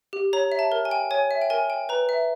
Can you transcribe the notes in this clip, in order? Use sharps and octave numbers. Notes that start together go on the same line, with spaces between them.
G4
C#5 A#5
E5
A5
A#4
G#5
G5
C#5 G#5
E5
G5
A#4 G#5
G5
B4 A#5
E5